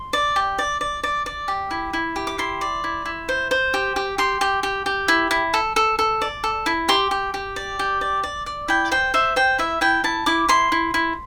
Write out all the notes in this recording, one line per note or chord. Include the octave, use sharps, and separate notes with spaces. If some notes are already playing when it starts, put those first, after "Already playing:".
Already playing: C6
D5
G4
D5
D5
D5
D5
G4
E4
E4
G4
D6
E4 C6
D5
E4
E4
C5
C5
G4
G4
G4 C6
G4
G4
G4
E4
E4
A4
A4
A4
D5
A4
E4
G4 C6
G4
G4
D5
G4
D5
D5
D5
E4 G5
C5 G5
C5 E5
C5 G5
E4 E5
E4 G5
E4 A5
E4 D6
E4 C6
E4
E4